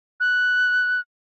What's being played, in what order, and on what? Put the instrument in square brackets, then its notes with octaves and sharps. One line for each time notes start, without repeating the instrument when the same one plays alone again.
[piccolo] F#6